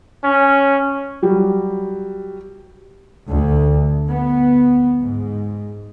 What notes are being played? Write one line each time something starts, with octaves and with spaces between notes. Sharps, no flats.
C#4
F#3 G3
D2
B3
G#2